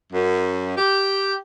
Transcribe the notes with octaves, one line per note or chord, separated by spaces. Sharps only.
F#2
G4